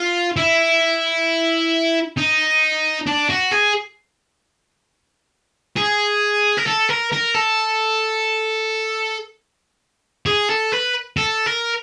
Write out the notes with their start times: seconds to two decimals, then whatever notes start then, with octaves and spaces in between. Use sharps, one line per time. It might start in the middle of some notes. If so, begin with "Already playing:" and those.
Already playing: F4
0.37 E4
2.17 D#4
3.07 D4
3.30 F#4
3.52 G#4
5.77 G#4
6.58 A#4
6.67 A4
6.89 A#4
7.12 A#4
7.34 A4
10.26 G#4
10.49 A4
10.72 B4
11.17 A4
11.46 A#4